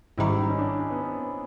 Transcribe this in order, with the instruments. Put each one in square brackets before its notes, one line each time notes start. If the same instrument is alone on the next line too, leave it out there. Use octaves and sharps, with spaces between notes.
[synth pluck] A1 G#2 D#3 G3 [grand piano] E4
[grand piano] D#4
C#4
D4
C#4
B3
C4
B3